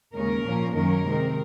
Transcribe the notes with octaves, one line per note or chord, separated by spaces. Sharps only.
D#2 C#3 G#3 C#4 A#4
A#2 F3 A#3 C#4
F#2 D#3 F#3 A#3 C#4 A#4
C3 D#3 G#3 C4